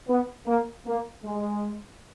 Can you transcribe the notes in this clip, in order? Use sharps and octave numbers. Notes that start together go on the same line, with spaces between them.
B3
A#3
A#3
G#3